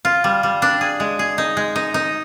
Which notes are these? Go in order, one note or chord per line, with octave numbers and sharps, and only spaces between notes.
F4
G3
G3
D4
G#4
G#3
G#4
D#4
G#3
D#4
D#4